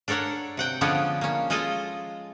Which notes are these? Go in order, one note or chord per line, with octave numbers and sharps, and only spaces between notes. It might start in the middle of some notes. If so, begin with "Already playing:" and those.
D4 A4 A#4 C#5 F#5
C3 F#5 G5
D3 F3 G#3 B3 C#4 D4
A#3 C#4
G#3 F4 A4 D#5 G#5